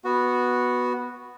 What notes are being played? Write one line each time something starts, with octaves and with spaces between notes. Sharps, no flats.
B3 F#4